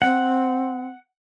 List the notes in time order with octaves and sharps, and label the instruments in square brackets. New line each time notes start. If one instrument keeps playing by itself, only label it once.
[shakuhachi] C4 [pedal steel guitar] F#5